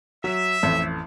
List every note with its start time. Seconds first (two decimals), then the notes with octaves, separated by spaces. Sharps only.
0.24 F#3 E5
0.63 A1 F2